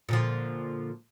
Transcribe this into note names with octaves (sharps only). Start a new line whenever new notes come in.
A#2 D3 F3